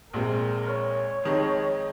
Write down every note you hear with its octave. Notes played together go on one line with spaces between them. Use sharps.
A#1 A#2 G#3 C4 A#4
C#5
F2 D#3 G#3 D#4